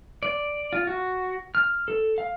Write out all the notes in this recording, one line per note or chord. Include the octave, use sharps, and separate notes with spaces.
D5
F4
F#4
F6
A4
F5